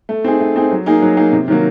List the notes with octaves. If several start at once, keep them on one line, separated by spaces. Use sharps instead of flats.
A3
C4 D#4 G#4
A3
C4 D#4 G#4
F#3
A#3 D#4 G#4
F#3
A#3 D#4 G#4
C3
D#3 F#3 A#3